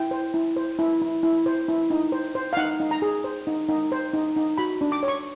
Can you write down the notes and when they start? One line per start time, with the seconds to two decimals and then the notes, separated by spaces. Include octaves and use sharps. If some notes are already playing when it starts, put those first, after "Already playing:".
Already playing: E4 G5
0.11 C5
0.34 E4
0.56 C5
0.79 E4
1.01 E4
1.23 E4
1.46 C5
1.69 E4
1.90 D#4
2.12 C5
2.35 C5
2.53 F5
2.57 D#4 F#5
2.80 D#4
2.91 A#5
3.02 G#4
3.24 C5
3.47 D#4
3.69 D#4
3.92 C5
4.14 D#4
4.36 D#4
4.58 F#4 B5
4.81 D4
4.92 D6
5.03 C#5
5.08 C#6